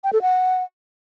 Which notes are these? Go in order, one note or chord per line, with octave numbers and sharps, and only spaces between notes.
G5
A4
F#5